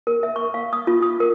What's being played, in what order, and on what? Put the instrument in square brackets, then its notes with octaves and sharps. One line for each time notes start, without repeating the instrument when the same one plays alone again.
[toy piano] A#4
E5
C#6
F5
D#6
F4
D#6
A#4